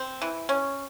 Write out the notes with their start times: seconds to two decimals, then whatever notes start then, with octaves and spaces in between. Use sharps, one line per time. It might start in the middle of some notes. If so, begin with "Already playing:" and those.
Already playing: C4
0.22 E3
0.49 C#4